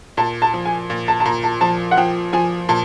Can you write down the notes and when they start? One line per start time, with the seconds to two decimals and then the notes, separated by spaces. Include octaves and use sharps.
0.17 A#2 A5
0.42 A5
0.54 F3
0.65 G#5
0.90 A#2
1.08 A5
1.20 A5
1.25 A#2 A#5
1.44 A5
1.61 F3 A5
1.91 F#5
1.97 F3 G5
2.33 F3 G#5
2.69 A#2 A5